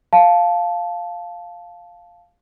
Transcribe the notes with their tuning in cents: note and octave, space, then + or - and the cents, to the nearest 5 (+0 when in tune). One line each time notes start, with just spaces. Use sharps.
F5 +0 A5 -10